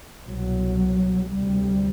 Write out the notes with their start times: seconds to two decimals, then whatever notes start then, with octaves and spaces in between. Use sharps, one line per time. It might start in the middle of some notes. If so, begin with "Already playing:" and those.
0.27 C2 B2 F#3
1.28 D2 C3 G3